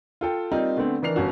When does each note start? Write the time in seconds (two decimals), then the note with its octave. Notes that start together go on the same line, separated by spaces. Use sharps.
0.21 F4 A4 G5
0.51 G3 A#3 C4 D#4 F4
0.77 D3 A3 B3 C4
1.02 D#3 E3 D4 A#4 C7 F7
1.16 G1 C#4 F#4